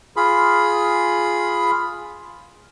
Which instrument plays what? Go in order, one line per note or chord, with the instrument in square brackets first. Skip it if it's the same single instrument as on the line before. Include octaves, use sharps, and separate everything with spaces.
[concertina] F4 G#4 B5